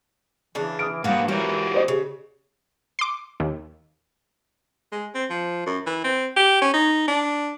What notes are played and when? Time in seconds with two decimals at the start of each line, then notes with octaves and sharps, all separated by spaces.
0.55 C#3 E3 D4
0.79 D#6 F6 D7
1.04 G#2 G3 A#3 F#4 B4
1.28 E3 F#4 G4 A#4 C#5
1.74 C5 D5 D#5
1.88 C#3 G4
2.99 C6 D6
3.40 D#2
4.92 G#3
5.14 C4
5.30 F3
5.66 F#2
5.86 E3
6.04 C4
6.36 G4
6.61 C#4
6.74 D#4
7.08 D4